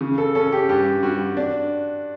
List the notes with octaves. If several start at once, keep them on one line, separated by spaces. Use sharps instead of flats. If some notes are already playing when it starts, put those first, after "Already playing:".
C#3
A4
C#4 A4
G4
G2 G4
G2 F#4
D4